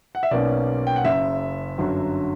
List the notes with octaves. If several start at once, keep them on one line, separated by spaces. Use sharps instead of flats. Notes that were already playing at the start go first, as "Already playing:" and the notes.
F#5
E5
B1 B2 A#3 C#4 D5
G5
F#5
F#1 F#2 C#3 E5
G1 F#2 D3 F#3